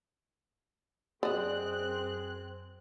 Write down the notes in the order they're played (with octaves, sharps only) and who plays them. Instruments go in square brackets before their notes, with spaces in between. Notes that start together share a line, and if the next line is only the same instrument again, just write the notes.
[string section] F#2 C4 F#6 [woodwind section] G#4 [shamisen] D5 D#5